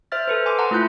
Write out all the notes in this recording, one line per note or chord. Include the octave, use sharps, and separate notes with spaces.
C5 E5 F6 A6
A4 B4 C5
G#5 C6 D6
F#5 A5 A#5 C6
A3 E4 F4 F#6 G6